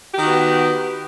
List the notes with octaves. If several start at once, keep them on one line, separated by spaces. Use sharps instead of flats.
D#3 B3 F#4 G4